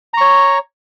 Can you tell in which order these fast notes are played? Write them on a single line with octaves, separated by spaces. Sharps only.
A#5 C#6 C#5